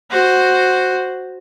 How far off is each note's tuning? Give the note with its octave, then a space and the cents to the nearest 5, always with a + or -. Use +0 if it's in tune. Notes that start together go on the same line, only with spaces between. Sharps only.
F#4 +0 C5 +0